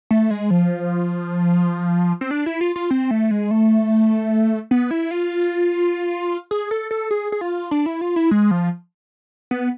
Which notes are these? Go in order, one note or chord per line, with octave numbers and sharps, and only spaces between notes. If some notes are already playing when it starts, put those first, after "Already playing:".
A3
G#3
F3
C4
D4
E4
F4
F4
C4
A3
G#3
A3
B3
E4
F4
G#4
A4
A4
G#4
G#4
F4
D4
E4
F4
E4
G#3
F3
B3